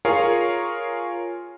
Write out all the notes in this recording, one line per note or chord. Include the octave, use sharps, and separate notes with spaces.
F4 G#4 A#4 C#5 F5